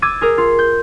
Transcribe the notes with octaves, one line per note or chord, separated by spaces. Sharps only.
D6 E6 G#6 A6 D#7
G#4 A#4
F4
G6